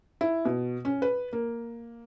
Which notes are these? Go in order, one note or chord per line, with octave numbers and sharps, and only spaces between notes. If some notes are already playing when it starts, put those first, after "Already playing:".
E4
B2
C#4
B4
A#3